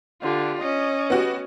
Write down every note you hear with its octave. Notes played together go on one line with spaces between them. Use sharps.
D3 F4 G4
C#4 D#5
B3 F#4 G4